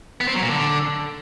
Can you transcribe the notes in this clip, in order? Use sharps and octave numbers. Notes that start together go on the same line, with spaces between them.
B3
C4
F#3
A#2
D3